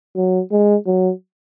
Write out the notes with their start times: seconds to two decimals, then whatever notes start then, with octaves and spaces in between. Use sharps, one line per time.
0.16 F#3
0.51 G#3
0.86 F#3